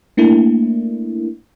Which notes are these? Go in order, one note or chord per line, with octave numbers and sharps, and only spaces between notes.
A3 A#3 D4 E4